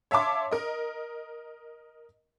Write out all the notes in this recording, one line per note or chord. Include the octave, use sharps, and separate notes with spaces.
C#5 E5 F5 A5 C6 D6
A#4 D#5